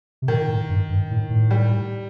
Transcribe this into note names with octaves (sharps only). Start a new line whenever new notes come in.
C3
A#2 D#3
A2
G2
G2
A2
A2
G3